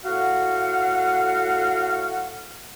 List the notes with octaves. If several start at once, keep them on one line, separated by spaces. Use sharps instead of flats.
A2 F#4 F5 F#5